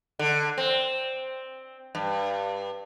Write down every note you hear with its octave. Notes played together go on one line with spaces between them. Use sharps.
D3
C4
G2